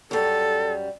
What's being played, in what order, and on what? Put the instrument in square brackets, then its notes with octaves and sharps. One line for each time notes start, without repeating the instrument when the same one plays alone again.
[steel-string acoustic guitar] F#2 G3 [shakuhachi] A4